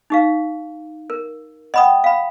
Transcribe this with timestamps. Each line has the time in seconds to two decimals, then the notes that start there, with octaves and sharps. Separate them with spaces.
0.10 D#4 G4 F5
1.10 A#4
1.74 D#5 F#5 G5 B5 D#6
2.04 F5 B5